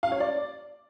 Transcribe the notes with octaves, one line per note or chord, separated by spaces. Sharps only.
F5
C#5
D5